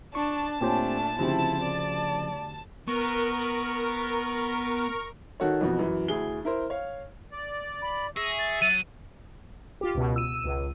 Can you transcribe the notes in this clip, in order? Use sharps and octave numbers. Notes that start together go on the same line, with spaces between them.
D4 A5 C#6
A#2 A3 C4 D4 G4 C5 C#5 G#5
D2 C#3 F3 C4 E4 G4
D5
B3 A#4 C#6
D#3 F#4 A4 C#5
F2 B2 E3 F3 F#4
F#2 E3
D2 E4 G#4 G7
E4 A#4 C5
C#5 F5
D5
B5
G#4 E5 C#6 E6 A#6
A6
F#3 A6 D#7
F4 G4
C#2 B2
E6 D#7
C#2